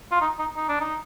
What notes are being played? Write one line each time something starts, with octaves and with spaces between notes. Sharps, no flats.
F4
D#4
D#4
D#4
D4
D#4